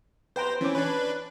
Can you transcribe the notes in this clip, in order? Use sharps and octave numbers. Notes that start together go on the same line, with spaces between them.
B4 C5 G5 A#5
E3 C#4 D6
D4 B4 C#5